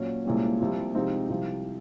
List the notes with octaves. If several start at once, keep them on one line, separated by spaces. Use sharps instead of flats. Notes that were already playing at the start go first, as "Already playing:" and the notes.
Already playing: A#2 F#3 C#4
C2 A#2 G#3 C#4
C2 C3 F3 C4
C3 F3 G#3 C4 D#4
C2 C3 F3